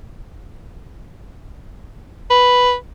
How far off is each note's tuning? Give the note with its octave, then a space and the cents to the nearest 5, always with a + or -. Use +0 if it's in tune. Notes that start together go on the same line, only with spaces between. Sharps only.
B4 +0